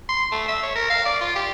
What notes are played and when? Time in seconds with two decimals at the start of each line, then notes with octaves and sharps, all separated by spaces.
0.09 C6
0.32 A3
0.48 E5
0.63 C#5
0.75 A#4
0.90 F5
1.05 D5
1.21 F4
1.35 G4